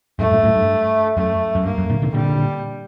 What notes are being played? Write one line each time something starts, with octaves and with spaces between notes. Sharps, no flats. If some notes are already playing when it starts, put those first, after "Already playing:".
F#2 A2 A3
G2 A#2
F#2 A2
G2
F#2 A3
F#2
G2 A#3
F#2
A#2 D3
C3 D#3
A#2 D3 G3